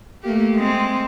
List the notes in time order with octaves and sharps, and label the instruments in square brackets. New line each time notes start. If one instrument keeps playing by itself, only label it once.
[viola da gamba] A3 A#3 G4
G#3 C4